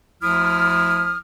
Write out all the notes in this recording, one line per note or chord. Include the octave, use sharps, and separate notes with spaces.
D2 F3 E4 D#6 F6